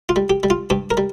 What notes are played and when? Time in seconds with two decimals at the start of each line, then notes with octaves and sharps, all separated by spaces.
0.09 F4
0.16 G3
0.30 G4
0.43 G3
0.50 F4
0.70 G2 G4
0.91 A#4
0.97 G3